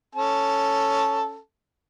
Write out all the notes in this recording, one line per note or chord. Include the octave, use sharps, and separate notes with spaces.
C#4 A4 A5